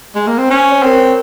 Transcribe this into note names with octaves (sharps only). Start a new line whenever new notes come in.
G#3
A#3
C4
C#4 C5
C#5
C4 A#4
C5